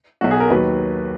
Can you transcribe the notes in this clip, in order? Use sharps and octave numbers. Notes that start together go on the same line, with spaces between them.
B1 B2 F#3 F#4
G#4
A#4
D#2 D#3 F#3 B4